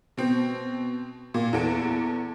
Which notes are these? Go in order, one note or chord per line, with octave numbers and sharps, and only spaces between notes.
B2 C4
A#2
E2 E3 B3 A4 D7